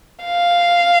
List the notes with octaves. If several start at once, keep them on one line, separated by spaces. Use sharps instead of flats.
F5